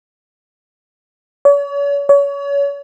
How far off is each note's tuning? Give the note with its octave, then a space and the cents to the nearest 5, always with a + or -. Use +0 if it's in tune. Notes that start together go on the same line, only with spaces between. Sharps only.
C#5 +40
C#5 +30